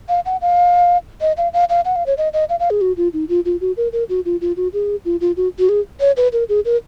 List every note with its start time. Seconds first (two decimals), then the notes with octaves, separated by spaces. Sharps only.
0.09 F5
0.26 F#5
0.42 F5
1.21 D#5
1.37 F5
1.53 F5
1.69 F5
1.85 F#5
1.96 F5
2.06 C#5
2.17 D#5
2.33 D#5
2.49 F5
2.60 F5
2.70 G#4
2.81 F#4
2.97 F4
3.13 D#4
3.29 F4
3.45 F4
3.61 F#4
3.77 A#4
3.93 A#4
4.09 F#4
4.25 F4
4.41 F4
4.57 F#4
4.73 G#4
5.05 F4
5.21 F4
5.37 F#4
5.59 F#4
5.69 G#4
6.00 C#5
6.17 B4
6.33 A#4
6.49 G#4
6.65 A#4